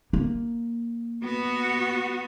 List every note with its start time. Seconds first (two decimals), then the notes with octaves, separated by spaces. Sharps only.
0.13 A#3
1.24 B3 F#4